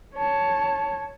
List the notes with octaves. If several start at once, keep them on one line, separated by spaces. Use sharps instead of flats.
C#5 A5